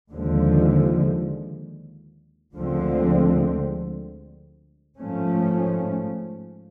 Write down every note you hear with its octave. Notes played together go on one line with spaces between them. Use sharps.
D#2 D3 F3 G#3
D2 D3 F3 G#3 C4
G#2 F3 A3 C#4